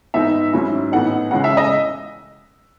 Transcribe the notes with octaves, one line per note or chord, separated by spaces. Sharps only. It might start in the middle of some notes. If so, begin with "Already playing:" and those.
G#2 E3 B3 D#4 E5
G#2 F#3 C#4 E4
A2 E3 B3 D#4 F#5
C#3 E3 G#3 C#4 E4 F#5
E5
D#5